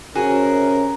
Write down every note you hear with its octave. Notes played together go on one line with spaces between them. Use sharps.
C3 C#4 F#4 G#4 A#4